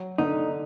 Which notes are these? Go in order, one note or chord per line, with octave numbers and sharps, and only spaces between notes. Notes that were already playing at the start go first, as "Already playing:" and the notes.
Already playing: F#3
D3 D#4